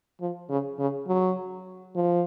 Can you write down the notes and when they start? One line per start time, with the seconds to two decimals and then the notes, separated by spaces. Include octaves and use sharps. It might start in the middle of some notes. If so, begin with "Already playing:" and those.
0.21 F3
0.50 C#3
0.79 C#3
1.07 F#3
1.96 F3